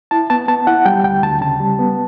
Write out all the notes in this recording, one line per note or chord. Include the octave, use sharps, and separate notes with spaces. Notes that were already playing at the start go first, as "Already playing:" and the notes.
E4 A5
B3 A5
B3 A5
E4 F#5
G3 G5
D2 G5
D2 A5
C#3 A5
G3
B3